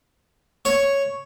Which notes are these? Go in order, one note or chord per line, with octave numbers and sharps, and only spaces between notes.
C#5